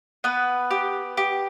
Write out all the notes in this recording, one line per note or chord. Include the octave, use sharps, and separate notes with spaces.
B3 B4
G4
G4